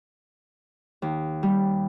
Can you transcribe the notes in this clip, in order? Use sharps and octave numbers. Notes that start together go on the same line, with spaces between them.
D#2
G3